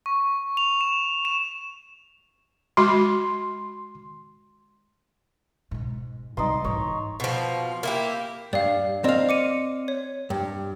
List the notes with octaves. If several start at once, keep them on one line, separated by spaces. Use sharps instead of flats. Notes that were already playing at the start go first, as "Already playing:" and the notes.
C#6
F7
E7
E7
G#3 F#4 B5 C6
G#2 B2
C3 G3 D#4 D5 C6
G#2 E3 C#5
B2 F3
A#3 E4 G4
G2 D5 F5
C4 D5 D#5 F5
D6 C#7 D#7
C#5
G2